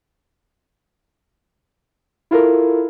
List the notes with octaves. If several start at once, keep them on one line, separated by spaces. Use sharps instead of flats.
E4 F4 A4 A#4